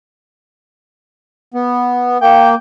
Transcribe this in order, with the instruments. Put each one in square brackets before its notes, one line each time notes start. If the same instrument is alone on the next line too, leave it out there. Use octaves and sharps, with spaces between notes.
[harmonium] B3
[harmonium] A#3 [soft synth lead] G5